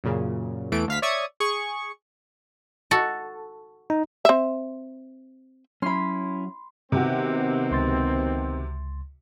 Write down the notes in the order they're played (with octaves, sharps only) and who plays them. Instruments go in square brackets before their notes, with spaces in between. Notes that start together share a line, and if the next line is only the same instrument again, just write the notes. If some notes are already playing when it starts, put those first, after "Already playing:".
[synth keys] F#2 A#2 C#3
E2 E3 A3 D7
D2 F5 B6
C#5 D5 E5 C#6 D#6 G#6
G#4 C#6
[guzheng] F#4 A4
[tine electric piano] D#4
[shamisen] C4 E5
[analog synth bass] F#3 [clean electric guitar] C#4 E4 [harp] B5 C6
[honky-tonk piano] C3 F#4 [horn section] D#3 B3 C4
[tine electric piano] C#2 C6 A6